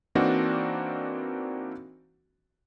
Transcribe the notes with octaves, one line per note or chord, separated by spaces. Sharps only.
E3 A#3 C4 D4 D#4 F#4